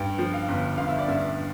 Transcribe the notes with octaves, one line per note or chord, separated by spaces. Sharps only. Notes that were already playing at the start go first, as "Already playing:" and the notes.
Already playing: G2 G5
F3
F5
G1
G1 F5
E5
D5
G2 E5